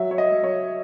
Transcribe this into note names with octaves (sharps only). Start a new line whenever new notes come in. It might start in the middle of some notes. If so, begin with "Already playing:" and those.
Already playing: F#3 E5
C#5
D#5
F#3
C#5